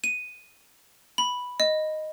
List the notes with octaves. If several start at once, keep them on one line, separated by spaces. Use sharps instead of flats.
D#7
B5
D#5